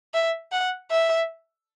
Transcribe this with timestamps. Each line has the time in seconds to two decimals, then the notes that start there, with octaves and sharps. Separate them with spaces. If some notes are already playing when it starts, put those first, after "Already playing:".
0.14 E5
0.52 F#5
0.90 E5